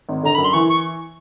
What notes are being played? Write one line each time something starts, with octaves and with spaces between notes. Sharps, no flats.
G#1
D3 A#5
F#2 B5
C6
E3 C#6
C#6